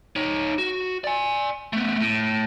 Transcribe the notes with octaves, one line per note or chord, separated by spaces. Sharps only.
D#4 C#5
F#4
D5 G#5
A3 B3
A2